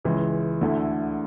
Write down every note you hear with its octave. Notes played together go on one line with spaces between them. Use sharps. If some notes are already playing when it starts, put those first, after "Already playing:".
C#2 C#3 E3 G#3
D2 D3 A3 E4